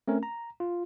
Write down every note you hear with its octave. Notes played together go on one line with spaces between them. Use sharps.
A3 C4 C#4 A#4
A#5
F4